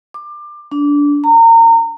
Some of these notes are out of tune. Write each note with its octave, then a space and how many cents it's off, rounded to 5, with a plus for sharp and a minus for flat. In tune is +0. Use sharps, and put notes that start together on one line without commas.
D6 +25
D4 -20
A#5 -30